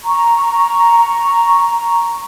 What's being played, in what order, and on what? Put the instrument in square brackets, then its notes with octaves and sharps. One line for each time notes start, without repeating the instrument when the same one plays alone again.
[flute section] A#5 C#6